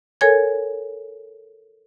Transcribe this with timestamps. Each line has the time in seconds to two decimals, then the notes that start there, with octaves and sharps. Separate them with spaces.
0.21 A4 A#4 C#5 G#5 G#6